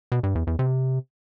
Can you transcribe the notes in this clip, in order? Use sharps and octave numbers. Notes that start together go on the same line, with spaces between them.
B2
G2
E2
E2
C3